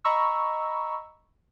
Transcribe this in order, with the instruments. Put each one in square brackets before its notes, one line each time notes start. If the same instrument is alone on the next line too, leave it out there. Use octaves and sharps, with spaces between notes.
[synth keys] D#5 A#5 B5 C#6 E6